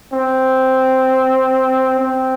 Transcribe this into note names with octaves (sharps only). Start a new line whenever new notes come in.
C4
C4